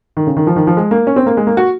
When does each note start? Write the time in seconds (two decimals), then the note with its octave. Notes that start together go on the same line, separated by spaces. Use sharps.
0.17 D#3
0.27 C#3
0.37 D#3
0.47 F3
0.56 D#3
0.67 F3
0.77 G#3
0.91 A#3
1.07 C#4
1.16 C4
1.26 A#3
1.37 G#3
1.47 A#3
1.57 F#4